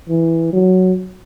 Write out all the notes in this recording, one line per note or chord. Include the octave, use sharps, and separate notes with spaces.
E3
F#3